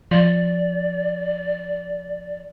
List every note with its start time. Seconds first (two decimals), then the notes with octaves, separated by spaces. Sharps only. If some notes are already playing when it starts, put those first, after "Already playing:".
0.11 F3 D5